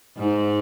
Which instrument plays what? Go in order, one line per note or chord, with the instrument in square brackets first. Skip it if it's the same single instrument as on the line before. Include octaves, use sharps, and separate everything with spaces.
[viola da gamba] G#2